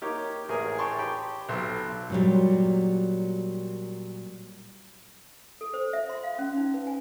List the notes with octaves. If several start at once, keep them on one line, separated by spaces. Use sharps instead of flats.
A#3 D#4 G4 C#5
A1 G#4 A#4 G#5
C#5 G5 A5 C6 C#6
G4 G5 B5
B1 A4 C6
A#2 F#3 G3
A4
C5
E5
C6
F5
C#4
D#4
B4
G#5